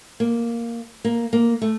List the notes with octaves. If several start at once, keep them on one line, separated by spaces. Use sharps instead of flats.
A#3
A#3
A#3
A3